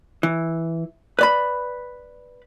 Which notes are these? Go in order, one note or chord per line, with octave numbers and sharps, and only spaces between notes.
E3
B4 D5 B5